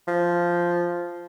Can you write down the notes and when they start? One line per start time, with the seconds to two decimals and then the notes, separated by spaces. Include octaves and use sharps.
0.07 F3